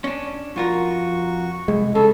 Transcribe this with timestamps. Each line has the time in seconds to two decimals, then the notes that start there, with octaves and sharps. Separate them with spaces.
0.04 C#4 D4
0.56 F2 F4 F#4 A#4 C#6
1.68 C2 G#3
1.95 C#3 A4